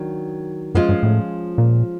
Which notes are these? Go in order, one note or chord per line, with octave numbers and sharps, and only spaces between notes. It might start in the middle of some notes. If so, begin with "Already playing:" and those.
Already playing: D#3 F#3 D4
F#2 F3 G#3 C#4 F4
G2
A2
A#2